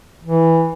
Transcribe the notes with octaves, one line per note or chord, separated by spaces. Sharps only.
E3